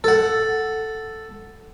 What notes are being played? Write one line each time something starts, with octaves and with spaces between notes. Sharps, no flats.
A4 F#5